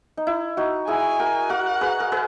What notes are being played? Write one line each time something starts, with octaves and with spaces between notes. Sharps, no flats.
D#4
E4
D#4 F#4
E4 G#4 G#5
F#4 A#4
F#4 A#4 F#5
G#4 B4
A#4
G#4 B4